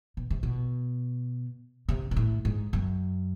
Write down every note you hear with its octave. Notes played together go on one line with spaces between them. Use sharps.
B2
C3
B2
C3
A#2
A2
G#2
F#2